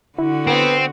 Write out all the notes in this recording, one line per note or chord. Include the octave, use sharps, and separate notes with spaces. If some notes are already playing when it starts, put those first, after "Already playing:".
D3 E4 F#4
B3 C4